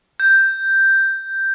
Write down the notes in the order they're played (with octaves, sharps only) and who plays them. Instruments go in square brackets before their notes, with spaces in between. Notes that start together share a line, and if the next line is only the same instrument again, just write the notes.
[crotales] G6